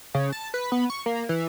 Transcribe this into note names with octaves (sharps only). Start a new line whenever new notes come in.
C#3
A5
B4
B3
C#6
A#3
E3